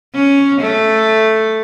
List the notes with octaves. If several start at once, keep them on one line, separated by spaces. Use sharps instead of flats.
C#4
A3